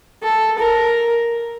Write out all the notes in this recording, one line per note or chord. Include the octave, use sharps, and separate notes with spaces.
A4
A#4